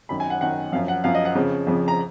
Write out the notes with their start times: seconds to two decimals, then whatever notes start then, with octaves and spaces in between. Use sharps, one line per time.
0.09 F#2 D#3 B5
0.20 G#5
0.30 F#5
0.41 F#2 D#3 F#5
0.72 F#2 F3 F5
0.88 F#5
1.04 F#2 F3 F5
1.15 D#5
1.25 F#5
1.35 F2 C#3 F3
1.67 F2 C#3 F3
1.88 A#5